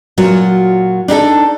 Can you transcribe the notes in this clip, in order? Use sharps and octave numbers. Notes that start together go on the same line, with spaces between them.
A#2 F#3 F4 F#4
D4 D#4 G4 A4